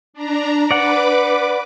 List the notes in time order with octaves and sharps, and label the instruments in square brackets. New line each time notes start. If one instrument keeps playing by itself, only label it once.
[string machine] D4 A#5
[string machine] B4 D6 [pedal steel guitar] D5 F#5